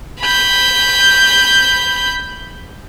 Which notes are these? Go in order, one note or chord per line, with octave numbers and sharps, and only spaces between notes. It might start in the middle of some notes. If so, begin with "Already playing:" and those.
B5 G6